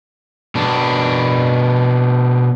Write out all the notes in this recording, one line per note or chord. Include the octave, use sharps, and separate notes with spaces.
B2 D4